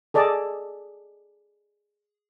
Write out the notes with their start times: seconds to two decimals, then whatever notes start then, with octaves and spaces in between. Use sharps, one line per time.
0.14 G#4 A4 D5 D#5 A5